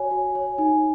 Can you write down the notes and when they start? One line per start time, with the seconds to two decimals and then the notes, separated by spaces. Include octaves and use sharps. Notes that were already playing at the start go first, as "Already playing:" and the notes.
Already playing: F#4 C#5 G#5
0.11 F#4
0.35 C#5
0.58 D#4 G#5